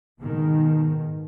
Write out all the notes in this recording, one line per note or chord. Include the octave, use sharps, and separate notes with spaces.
G#2 B2 D#3